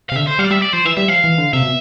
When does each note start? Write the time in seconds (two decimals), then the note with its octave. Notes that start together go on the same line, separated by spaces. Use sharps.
0.09 F5
0.12 C3
0.16 D3 E5
0.27 C5
0.39 G3 F5
0.44 D5
0.51 G3 E5
0.62 D5
0.73 F3 C5
0.85 E3 E5
0.97 G3 E5
1.08 F3 F5
1.24 E3
1.38 D3
1.53 C3 E5
1.63 B2